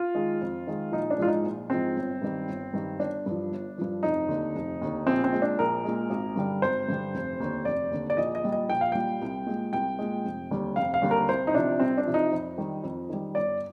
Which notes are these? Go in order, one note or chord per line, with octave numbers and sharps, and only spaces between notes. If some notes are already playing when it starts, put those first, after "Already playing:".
Already playing: F4
D#3 G#3
F2
D#3 G#3
A#1 D#4
D4
G#2 F3 G#3 F4
D#4
A#1
G#2 F3 G#3 C4
G1
G2 D#3 G3
G1
G2 D#3 G3
G1 D4
G2 F3
G1
G2 F3
F1 D#4
D#2 D3
F1
D#2 D3
A#1 C4
C4
A#2 G#3
D4
A#1 A#4
A#2 G#3
G#1
G2 D3 G3
G#1 C5
G2 D3 G3
F1
D#2 D3
F1 D5
D#2 D3
D5
A#1 D#5
D#5
A#2 G3
D#5
A#1 G5
F5
A#2 G3 G5
C2
A#2 G#3
C2 G5
A#2 G#3
F1
D#2 D3 G3
F1 F5
F5
D#2 D3 G3
A#4
C2 C5
D#4
C3 F3 D4
C2 C4
D4
C3 F3
D#4
F2
D#3 G3
F2
D#3 G3
G1 D5